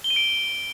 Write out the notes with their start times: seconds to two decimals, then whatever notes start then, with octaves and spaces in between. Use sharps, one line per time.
0.04 G7
0.10 D#7
0.16 D7